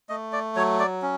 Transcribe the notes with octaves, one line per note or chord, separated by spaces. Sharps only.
A3 D#5
D5
F#3 C#5
D5
C#4